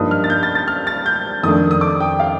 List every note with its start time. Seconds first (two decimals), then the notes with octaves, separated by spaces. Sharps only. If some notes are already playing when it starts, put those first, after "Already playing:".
Already playing: G2 F3 A#3 D#4 D#6
0.11 F6
0.24 A6
0.30 G6
0.43 A6
0.55 A6
0.68 F6
0.87 A6
1.06 G6
1.43 F2 D#3 A3 D4 D#6
1.71 D#6
1.81 D6
2.00 G5
2.20 F5